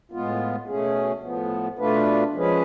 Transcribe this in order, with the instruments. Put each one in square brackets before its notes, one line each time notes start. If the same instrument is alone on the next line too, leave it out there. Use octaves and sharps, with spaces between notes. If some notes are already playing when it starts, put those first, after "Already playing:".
[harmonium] A2 G#3 B3 F4
B2 A3 C#4 G#4
A2 F3 B3
B2 A3 D4 F4 B4
F3 G#3 C#4 G#4 B4